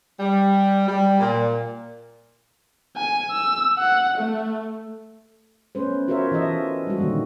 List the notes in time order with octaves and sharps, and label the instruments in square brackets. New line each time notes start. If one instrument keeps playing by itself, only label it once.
[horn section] G3
G3
A#2
[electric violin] G#5
E6
F#5
A3
[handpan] A3 B3 C#4 B4 C5
F4 F#4 A#4 C5 C#5 E5
E3 E4 A4 D#5 E5
G3 G#3 F#4
A#2 D3 D#3 A3 A#3